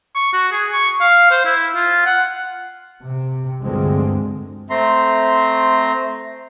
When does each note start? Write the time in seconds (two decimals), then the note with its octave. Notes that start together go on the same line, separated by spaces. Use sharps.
0.15 C#6
0.33 F#4
0.52 G#4
0.73 C#6
1.00 F5
1.31 C5
1.45 E4
1.75 F4
2.06 F#5
3.03 C3
3.62 D2 G2 D3 F3 G#3 C4
4.70 A3 C4 A#5 C6